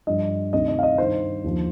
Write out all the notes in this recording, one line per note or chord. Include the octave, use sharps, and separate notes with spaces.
G2 F3 D#5
D2 C3 D#3 D#5
D#5
F5
D#5
G2 D#3 C5
D#2 D3 F3